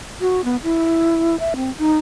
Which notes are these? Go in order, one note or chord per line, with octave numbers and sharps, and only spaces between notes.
F#4
B3
E4
E5
C4
D#4